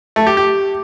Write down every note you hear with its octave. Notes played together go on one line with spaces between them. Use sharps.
A3
G4
G4